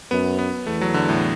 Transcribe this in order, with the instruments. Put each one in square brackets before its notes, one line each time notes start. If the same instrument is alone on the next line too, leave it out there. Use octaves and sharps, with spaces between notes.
[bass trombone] F#2 [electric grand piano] B3
[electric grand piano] B3
[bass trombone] E2 [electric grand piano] A3
[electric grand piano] F#3
D3
A2